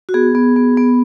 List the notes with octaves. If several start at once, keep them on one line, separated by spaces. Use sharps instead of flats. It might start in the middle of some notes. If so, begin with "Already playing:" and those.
F#4
B3 G#4
B3
B3
B3